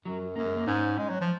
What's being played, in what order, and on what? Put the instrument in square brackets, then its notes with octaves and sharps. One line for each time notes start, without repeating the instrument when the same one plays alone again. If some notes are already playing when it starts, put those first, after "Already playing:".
[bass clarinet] F#2 [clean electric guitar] F#3
[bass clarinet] F#2 [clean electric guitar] A#3
[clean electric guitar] G#3
A#3
[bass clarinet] G#2 [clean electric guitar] C#4
[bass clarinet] G#3
F#3
F3